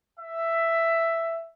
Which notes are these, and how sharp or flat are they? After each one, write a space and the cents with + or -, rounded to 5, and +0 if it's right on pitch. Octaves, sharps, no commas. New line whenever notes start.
E5 +10